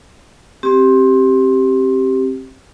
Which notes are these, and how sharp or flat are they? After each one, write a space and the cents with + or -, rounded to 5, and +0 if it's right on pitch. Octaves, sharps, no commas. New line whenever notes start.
C4 +20 G4 -10